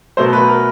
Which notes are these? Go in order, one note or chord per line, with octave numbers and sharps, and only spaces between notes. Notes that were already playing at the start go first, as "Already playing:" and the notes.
B2 F#3 A3 C5
B4
A#4